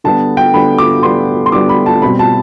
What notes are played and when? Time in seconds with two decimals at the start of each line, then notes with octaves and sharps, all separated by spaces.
0.04 D3 G3 B3 A5
0.37 G5
0.54 D3 G3 B3 B5
0.78 D6
1.03 D3 G3 B3 C6
1.46 C6
1.52 D3 G3 B3 D6
1.69 B5
1.86 A5
2.02 B2 G3 C4 B5
2.19 A5